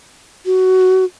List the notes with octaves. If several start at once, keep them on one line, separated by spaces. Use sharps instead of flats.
F#4